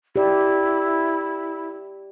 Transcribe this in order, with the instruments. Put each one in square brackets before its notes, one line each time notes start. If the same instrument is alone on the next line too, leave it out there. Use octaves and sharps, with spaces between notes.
[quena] E4 [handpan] G4 D5